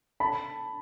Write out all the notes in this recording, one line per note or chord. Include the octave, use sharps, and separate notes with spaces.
A5 B5